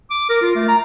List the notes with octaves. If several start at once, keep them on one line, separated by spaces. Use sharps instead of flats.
D6
A#4
F4
A3
A#5